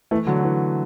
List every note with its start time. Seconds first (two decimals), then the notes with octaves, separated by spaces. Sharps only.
0.11 E3 A3
0.27 D3 F#3
0.43 E3